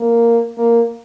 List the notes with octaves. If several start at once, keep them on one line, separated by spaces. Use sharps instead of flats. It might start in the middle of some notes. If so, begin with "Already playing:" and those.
Already playing: A#3
A#3